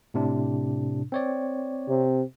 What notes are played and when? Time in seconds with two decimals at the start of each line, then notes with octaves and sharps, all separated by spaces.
0.14 A2 C3 D4
1.12 C4 C#5 D5
1.88 C3